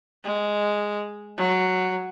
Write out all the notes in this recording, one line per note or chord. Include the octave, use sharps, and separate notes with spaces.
G#3
F#3